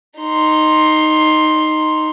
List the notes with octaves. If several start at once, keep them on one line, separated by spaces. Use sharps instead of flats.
D#4 C6